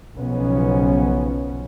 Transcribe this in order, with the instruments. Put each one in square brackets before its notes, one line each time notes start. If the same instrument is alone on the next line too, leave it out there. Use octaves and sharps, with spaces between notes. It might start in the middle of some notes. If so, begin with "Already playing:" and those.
[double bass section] B1 C#3 F3 B3 C#4